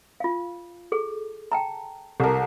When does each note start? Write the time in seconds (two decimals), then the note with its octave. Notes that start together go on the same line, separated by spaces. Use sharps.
0.20 F4 F5
0.92 G#4 A4
1.52 G5 A5 A#5
2.20 C2 A4 A#4 A5